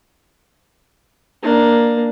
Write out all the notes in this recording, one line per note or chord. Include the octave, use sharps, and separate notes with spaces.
A#3 D4